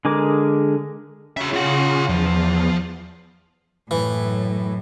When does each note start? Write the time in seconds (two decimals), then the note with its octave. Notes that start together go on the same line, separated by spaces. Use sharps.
0.05 D3 G#3 G#4 A#4 D6
1.37 C#3 F#4 E5
1.54 F4 F#5
2.09 E2 F3
3.91 F#2 A2 E3 C#4